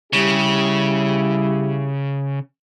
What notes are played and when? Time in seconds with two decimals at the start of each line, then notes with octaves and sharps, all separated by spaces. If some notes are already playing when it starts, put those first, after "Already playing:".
0.13 C#3 G3 E4 G4